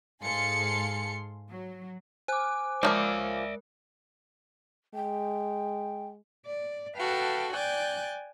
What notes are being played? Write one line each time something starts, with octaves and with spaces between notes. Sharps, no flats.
G#2 G#4 A4 F5 C6 C#7
F#3
C5 G#5 D6 F#6
F3 G3 G#3 A#3 A#4 D5 E5
G#3 G5
D5
F#4 A4 B4 F5 G5 A5
D5 G5 G#5 F#6 G6 A6